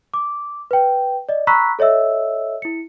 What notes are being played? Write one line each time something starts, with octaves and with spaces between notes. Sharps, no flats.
D6
B4 G5
D5 D#5
A#5 B5 C#6 E6 F#6 B6
A4 C#5 D#5 E5 E6
E4 C#7